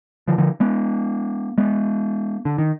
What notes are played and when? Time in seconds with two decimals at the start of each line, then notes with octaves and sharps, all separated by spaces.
0.28 D3 F3
0.38 D3 F3
0.60 G#3 B3
1.58 G#3 B3
2.45 D3
2.58 D#3